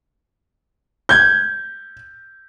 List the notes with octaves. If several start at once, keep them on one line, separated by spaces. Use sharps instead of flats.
G6 G#6